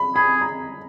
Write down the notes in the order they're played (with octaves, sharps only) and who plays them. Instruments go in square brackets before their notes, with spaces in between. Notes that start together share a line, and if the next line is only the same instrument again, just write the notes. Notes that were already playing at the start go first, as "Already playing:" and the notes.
Already playing: [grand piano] B5
[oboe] G#4 [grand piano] B5
[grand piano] A#5